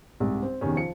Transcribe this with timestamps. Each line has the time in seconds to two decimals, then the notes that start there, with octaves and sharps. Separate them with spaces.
0.20 C2 G#2
0.43 C4
0.61 E2 C3 D#3 C#4
0.76 F3 C#7